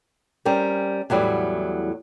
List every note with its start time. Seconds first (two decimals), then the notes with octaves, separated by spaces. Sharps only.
0.45 G3 C4 C#4 A#4
1.10 E2 A2 F#3 G3